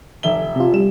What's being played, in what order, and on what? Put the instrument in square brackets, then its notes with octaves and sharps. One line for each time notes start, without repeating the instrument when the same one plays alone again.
[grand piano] F1 E5 G7
[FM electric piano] C3 F4
[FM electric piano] G3 [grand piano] E7